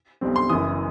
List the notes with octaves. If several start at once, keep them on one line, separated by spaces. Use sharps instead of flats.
B1 B2 G3 C4
C6
F#1 F#2 E3 D#6